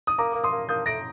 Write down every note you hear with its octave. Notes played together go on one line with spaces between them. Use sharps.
D#6
A#3 A#5 D6
A#3 D6
C6 D#6
A#3
A#3 D#6 G6
A3 A#6 D7